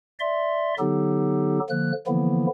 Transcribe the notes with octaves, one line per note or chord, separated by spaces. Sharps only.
D5 E5 C6
D3 F#3 B3 D#4 G4 A4
D3 F3 A#3 F#6
D3 E3 F3 A#3 B3 E4